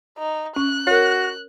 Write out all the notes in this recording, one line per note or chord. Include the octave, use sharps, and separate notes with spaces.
D#4
C#4 F#6
F#4 A#4 C#5